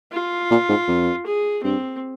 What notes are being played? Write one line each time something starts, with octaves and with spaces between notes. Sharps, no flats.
F4
A#2
G#2
F2
G#4
G2 C4